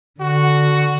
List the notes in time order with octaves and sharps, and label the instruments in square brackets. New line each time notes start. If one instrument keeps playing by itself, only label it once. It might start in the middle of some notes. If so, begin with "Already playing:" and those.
[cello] D3 [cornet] F#4